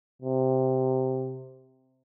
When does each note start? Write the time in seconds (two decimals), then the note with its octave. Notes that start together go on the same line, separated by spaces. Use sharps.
0.22 C3